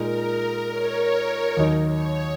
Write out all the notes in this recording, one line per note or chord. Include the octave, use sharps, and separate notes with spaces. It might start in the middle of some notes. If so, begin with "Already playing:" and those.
Already playing: A#2 G#3 D#4 A#4
C#5
D#2 D#3 F#3 D#4
C#5